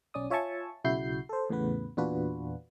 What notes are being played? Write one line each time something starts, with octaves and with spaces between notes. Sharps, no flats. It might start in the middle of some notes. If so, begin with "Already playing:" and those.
B1 C#4 D5 D#6
F4 C#5 E5 G#5 A5 C#6
B1 C#3 E4 F#4 G6 C7
A4 C5
E2 A2 C#3 B3 B4
E2 A#2 D4 F4 F#4 B4